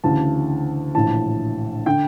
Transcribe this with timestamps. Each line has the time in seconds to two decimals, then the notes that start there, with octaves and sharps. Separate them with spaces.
0.04 D2 C#3 E3 A5
0.95 A#1 A2 E3 A5
1.86 D3 G5